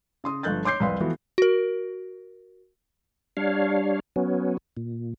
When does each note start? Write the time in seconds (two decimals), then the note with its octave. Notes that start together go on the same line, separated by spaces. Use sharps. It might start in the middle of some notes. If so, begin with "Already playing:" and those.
0.24 C#3 C6 D#6
0.43 G1 F3 A3 F#6 G6 A6
0.64 C#5 C6 D6 G6 C7
0.80 C2 F2 B4 F5 C6
1.00 E3 F3 A3 B3 F#4
1.38 F#4 A#4
3.37 G3 D4 C#5 F5
4.16 F#3 B3 C#4
4.77 A#2